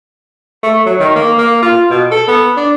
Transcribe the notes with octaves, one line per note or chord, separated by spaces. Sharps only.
A3
F#3
D#3
A#3
A#3
F4
B2
A4
B3
D4